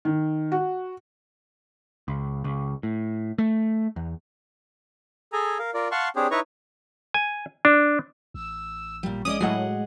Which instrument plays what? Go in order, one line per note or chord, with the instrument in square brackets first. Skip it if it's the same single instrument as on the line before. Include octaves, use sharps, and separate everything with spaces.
[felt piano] D#3
F#4
[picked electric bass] C#2
C#2
A2
A3
E2
[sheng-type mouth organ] G#4 A4 G#5 A#5
A#4 F5
F4 A#4 D5
F5 F#5 A5 C6 C#6
C4 D4 G4 G#4 C5 C#5
D#4 E4 B4 C#5 A#5 C#6
[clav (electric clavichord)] G#5
D4
[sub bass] A1 [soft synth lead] E6
[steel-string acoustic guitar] A#2 G3
[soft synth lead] G#3 [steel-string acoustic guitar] C#4 D5 D#5 [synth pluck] D#6
[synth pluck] A2 F#3 [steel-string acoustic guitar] G#4 D#5 F#5